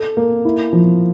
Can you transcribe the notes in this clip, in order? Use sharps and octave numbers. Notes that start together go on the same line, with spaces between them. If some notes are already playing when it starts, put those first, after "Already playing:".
Already playing: A4
A#3
E4
F3